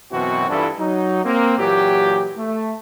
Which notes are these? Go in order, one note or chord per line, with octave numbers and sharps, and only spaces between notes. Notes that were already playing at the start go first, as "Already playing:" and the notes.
F#2 B2 E3 C4 F#4
G2 E3 D4 E4 F4 A4
F#3 D#4
A#3 C4
A#2 E3 F#3 G4
A3